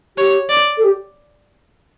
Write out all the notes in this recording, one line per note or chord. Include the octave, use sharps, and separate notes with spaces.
G4 C#5
D5
A4
G4